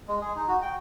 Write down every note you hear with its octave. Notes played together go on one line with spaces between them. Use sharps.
G#3
G#4
D#4
F#4
G5